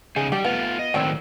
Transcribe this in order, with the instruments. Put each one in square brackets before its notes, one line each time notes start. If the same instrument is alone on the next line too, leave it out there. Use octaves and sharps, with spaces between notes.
[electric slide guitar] C#3 D#4 [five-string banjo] G#4
[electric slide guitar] G3 [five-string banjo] G4
[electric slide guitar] A3 F4 [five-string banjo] B3
[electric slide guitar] D#5
[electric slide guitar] A2 D#3 F#3 [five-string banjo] C4 D5 G5